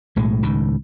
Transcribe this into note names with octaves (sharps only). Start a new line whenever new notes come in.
B1 A2 G#3
C#2 A2 D#3